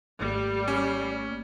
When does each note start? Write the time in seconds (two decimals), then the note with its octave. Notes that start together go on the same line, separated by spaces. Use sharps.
0.21 G#1 G3 A3 A#3
0.68 C#4